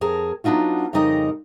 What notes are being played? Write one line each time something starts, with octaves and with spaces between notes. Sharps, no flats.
F2 G#4 A#4 A5
F#3 B3 D4 D#4 F4 F#4
F2 C#3 G3 D#4 A#4 D#5